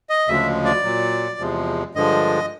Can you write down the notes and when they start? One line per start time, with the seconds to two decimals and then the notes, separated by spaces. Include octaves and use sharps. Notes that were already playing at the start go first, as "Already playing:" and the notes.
0.09 D#5
0.28 D2 C#3 F3 G#3 E5
0.65 D5
0.83 A#2 F#3
1.39 E2 C3 F3 G#3
1.95 G2 D3 F3 G#3 D#5